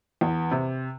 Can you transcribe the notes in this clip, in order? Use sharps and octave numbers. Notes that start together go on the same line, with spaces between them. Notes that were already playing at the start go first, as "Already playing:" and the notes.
E2
C3